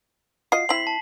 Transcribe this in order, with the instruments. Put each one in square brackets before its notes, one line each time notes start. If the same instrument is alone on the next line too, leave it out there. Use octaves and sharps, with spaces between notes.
[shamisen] F4 F#4 D#5 [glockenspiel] C7
[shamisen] C4 E4 [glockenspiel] B6 F#7
[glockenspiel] A5